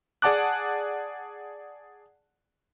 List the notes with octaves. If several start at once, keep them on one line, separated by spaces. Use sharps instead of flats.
G#4 D5 F#5 A5 D6 F#6